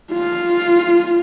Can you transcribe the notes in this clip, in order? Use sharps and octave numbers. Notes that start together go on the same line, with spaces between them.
F4